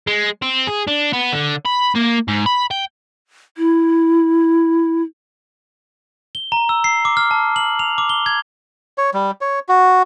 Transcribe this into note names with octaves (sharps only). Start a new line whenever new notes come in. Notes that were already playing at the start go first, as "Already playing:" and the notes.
G#3
C4
G#4
D4
B3
D3
B5
A#3
G#2
B5
G5
E4
G7
A#5
E6
C7
D6
F6
A5
F#7
F7
D6
G7
G#6
C#5
G3
C#5
F#4